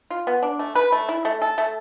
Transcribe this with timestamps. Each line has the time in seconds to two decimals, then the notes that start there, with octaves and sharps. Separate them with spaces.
0.10 F4
0.27 B3
0.42 D4
0.59 A3
0.75 B4
0.92 A3
1.09 E4
1.25 A3
1.42 A4
1.58 A3